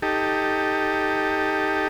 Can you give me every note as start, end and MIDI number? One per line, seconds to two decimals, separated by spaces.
0.02 1.88 63
0.02 1.88 67
0.02 1.88 69